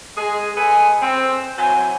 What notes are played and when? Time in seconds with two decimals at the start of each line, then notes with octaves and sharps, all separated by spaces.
0.17 G#3 G#4
0.57 G#3 A4 B4 G#5
1.02 C4
1.58 E3 F#3 C5 G#5